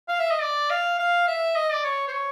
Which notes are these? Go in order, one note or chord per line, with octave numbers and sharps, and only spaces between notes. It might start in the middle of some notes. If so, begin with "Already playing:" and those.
F5
E5
D#5
D5
F5
F5
E5
D#5
D5
C#5
C5
C#5